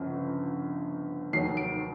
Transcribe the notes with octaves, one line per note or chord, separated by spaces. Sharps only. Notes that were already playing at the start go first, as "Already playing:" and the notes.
Already playing: G1 F2 C#3
F1 D#2 D#3 F#3 C7
D7